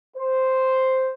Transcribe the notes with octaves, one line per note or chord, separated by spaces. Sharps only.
C5